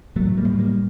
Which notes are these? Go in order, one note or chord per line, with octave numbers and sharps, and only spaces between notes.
A2 F#3 A3
G3 A#3
A2
G3 A#3